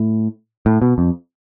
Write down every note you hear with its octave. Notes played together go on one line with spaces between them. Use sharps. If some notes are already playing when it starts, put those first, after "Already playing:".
Already playing: A2
A2
B2
F2